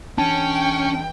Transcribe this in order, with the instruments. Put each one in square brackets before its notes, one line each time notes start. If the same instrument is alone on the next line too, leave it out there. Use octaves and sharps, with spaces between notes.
[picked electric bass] E3 D4 [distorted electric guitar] C#4 [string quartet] G5 [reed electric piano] A5